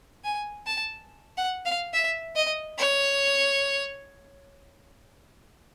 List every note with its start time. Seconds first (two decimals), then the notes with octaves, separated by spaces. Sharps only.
0.24 G#5
0.67 A5
1.38 F#5
1.66 F5
1.94 E5
2.36 D#5
2.78 C#5